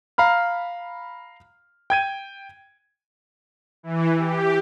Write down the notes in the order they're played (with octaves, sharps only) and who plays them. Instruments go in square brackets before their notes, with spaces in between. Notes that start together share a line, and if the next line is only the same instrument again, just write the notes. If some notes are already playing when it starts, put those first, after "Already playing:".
[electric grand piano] F5 A#5 B5 F6
G5 G#6 D#7
[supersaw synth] E3
G4